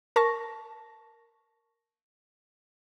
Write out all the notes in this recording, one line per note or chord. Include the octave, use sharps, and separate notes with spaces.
A#4 A5 C#6 A#6